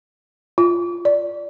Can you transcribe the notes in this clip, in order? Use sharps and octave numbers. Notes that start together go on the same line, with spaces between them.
F4
D5